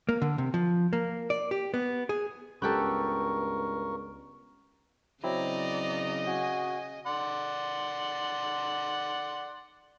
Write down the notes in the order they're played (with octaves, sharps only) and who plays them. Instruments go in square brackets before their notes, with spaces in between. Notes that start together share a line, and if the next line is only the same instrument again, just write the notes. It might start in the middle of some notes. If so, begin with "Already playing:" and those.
[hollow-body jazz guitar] A#3
D3
C3
F3
A#3
D5
G4
B3
G#4
[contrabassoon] C#2 [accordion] G2 A#4 C#6 [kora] B3 G4 A4
[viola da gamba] C#3 D#5 [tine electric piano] F#3 C4 E4 [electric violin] D5 A#5
[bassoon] F#4 [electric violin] G#5
[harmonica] D5 F#5 C6